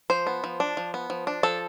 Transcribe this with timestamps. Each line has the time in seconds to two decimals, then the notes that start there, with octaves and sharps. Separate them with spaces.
0.10 F3 C5
0.27 B3
0.44 F3
0.60 D4
0.77 F3
0.94 B3
1.10 F3
1.27 D4
1.43 F3 A4